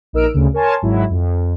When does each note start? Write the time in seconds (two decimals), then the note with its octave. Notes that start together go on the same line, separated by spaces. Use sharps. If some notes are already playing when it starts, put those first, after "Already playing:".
0.13 A#1 D#4 A#4 E6 F6 D7
0.34 D2 C#3
0.54 A#4 C#5 G#5 A5 C6
0.82 G#1 F#3 E4
1.10 F2